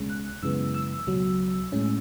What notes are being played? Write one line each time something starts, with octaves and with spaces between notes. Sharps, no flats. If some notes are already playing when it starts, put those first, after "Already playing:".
Already playing: C#2 B2 G#3 C#4
F#6
F#2 C#3 E3 G#3 B3 E6
E6
C#2 B2 F#3
A2 G#3 C#4